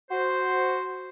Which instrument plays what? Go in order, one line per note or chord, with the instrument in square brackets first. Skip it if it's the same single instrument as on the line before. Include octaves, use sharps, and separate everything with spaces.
[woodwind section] F#4 C5